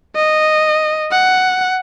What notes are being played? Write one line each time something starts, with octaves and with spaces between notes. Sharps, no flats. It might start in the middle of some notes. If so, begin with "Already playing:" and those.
D#5
F#5